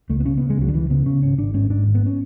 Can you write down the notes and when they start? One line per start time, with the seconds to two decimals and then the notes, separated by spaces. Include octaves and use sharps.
0.09 C#2 A3
0.20 B3
0.25 C#3 C#4
0.37 C#3 B3
0.50 G#3
0.58 C#2 F#3
0.69 D3
0.74 C#2 E3
0.90 C#3 B3
1.06 C#3 C#4
1.22 G#1 C#4
1.38 G#1 D4
1.54 G#2 C#4
1.70 G#2 D4
1.86 G#1
1.95 B3
2.06 C#4